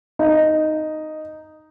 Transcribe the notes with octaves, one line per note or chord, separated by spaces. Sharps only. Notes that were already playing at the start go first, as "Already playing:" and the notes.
D#4